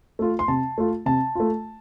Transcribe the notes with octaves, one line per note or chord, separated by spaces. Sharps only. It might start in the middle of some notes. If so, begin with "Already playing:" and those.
A3 F4
C6
C3 A5
A3 F4
C3 A5
A3 F4